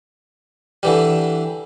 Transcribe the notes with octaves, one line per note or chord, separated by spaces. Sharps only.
D3 E3 G3